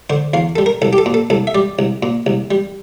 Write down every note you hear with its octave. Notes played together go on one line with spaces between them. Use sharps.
D3 C5
E2 F5
G3 A4
A#4
C2 A4
G4
A4
A#2
A4
C2 A4
E5
G3 D5
C2
A#2
C2
G3